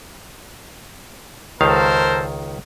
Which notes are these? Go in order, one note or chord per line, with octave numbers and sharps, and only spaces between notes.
C#2 D#3 A4 A#4 C5 F5